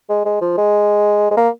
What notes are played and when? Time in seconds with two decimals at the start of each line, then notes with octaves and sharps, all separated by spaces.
0.10 G#3
0.26 G#3
0.41 F3
0.58 G#3
1.31 G#3
1.37 A#3